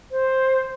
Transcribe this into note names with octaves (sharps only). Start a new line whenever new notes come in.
C5